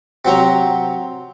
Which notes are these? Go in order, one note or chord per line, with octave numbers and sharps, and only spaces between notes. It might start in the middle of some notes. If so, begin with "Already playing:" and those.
C3 F#3 C4 A#5